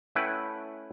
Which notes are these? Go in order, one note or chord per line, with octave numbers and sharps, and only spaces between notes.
A3 C#4 E4 B4 F#5 G5